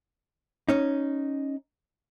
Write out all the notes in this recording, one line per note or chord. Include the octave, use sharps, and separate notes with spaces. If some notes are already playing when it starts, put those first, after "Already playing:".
C#4 D#4